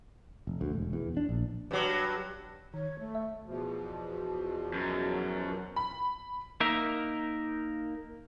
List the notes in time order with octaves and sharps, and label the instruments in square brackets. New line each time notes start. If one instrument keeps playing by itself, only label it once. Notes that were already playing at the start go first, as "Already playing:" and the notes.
[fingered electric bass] F1
D2
E1
E2
D4
A#1
[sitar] G2 F#3
[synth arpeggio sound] D#3 [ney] C#5
[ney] A3
[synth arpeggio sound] E5
[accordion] E2 B2 F3
[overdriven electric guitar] F#2
[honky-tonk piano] B5
[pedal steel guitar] A#3 D#4 A#4 E5